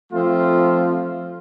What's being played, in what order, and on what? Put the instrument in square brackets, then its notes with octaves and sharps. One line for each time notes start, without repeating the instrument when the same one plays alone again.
[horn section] F3 A3 C4 F4